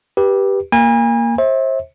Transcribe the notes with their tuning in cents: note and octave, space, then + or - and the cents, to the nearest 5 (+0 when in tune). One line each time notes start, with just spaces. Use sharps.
G4 +0 B4 -20
A#3 +0 G#5 -35 B5 -45
C5 +35 E5 -30